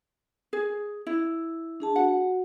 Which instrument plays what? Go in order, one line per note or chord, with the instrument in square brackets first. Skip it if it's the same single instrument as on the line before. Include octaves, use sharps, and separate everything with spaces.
[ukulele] G#4
E4
[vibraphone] D4 G#4 A5
[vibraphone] F#4 [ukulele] F#5